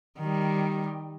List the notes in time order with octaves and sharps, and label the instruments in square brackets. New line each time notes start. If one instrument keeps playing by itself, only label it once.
[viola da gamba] D#3 G3